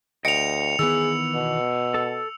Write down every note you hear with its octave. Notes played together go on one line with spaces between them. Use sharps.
D2 D#5 G5 C#7 F7
D#3 E3 B3 G#4 E6
B2
A4